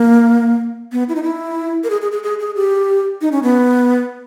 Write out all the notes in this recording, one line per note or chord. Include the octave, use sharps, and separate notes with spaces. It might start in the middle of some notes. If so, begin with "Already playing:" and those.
Already playing: A#3
B3
E4
D#4
E4
A#4
G#4
G#4
G#4
G#4
G#4
G4
D#4
C#4
B3